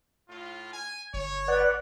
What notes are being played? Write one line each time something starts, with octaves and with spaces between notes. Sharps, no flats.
A2 F4
G#5
G1 C#5
B4 D5 F#5